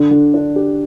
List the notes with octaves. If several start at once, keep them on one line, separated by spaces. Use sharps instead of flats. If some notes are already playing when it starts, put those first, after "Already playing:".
Already playing: D3 D4
D3
D4
G4